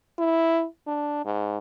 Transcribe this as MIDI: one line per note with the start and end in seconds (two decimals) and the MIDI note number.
0.18 0.65 64
0.87 1.21 62
1.25 1.58 44